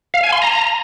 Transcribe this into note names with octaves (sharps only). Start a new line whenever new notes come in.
F5
G#5
C6
A#5